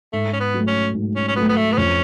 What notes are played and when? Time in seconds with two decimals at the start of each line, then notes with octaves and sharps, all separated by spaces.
0.13 G#2 A3
0.33 C#4
0.40 B3
0.54 F#3 A3
0.68 C#4
0.95 G#2
1.16 C#4
1.28 C#4
1.36 F#3 A3 B3
1.49 B3
1.56 A3
1.72 B3
1.77 F2 C#4